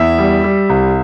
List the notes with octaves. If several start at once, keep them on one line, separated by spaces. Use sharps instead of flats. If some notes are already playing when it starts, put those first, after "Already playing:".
Already playing: E2 E5
G3
G3
C2